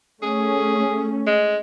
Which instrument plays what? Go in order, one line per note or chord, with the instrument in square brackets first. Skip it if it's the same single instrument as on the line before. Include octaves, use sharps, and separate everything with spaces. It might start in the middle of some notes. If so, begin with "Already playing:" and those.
[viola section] A3 C#4 [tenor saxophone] G#4
[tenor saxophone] G#3